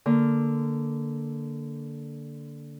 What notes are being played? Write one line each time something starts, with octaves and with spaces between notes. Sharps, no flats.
D3 A#3